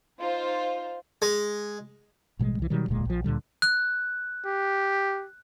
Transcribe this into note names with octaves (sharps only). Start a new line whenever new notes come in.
D#4 F4 C5
G#3
A1 B2 G3 G#3
C2 E3
B2 D#3 F#3 G3
E1 D2 A#2 G#3
A#1 F3
D2 A#2 D3 G3
F#6
G4